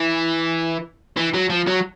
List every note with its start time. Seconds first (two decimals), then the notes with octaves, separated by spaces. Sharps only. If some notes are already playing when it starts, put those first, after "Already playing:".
Already playing: E3
1.17 E3
1.34 F#3
1.50 F3
1.67 F#3